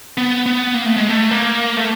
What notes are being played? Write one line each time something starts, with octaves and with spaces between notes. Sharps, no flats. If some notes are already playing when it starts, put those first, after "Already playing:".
B3
B3
A#3
A3
G#3
A3
A#3
A3